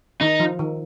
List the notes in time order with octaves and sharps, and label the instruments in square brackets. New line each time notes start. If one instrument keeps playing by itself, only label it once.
[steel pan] D#3 [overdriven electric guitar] D#4
[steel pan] F3
D#3